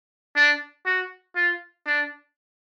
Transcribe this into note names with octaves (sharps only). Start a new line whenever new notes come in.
D4
F#4
F4
D4